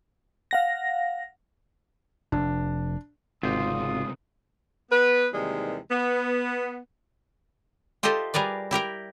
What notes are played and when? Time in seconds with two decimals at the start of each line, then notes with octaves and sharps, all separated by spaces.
0.51 F5 F#5 A#6
2.32 F1 D4
3.43 G#1 C#2 C3 F4 G4 G5 D#6
4.91 B3 B4
5.34 D#2 C3 D#3 E3 G3 G#3
5.91 B3
8.03 F4 G4 A4 C5 D#5 E5
8.34 G3 G#4 A#4 B4 D5
8.71 E4 G4 A#4 G5